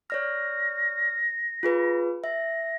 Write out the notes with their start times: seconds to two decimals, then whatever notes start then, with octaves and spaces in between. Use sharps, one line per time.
0.10 C#5 D5 F6 A#6
1.63 F4 G#4 B4
2.24 E5 A#6